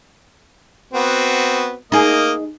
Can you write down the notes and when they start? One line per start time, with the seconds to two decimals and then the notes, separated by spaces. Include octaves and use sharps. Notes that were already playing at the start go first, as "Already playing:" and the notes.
0.94 B3 C4 F#4
1.92 A#3 D#4 G#4 D#5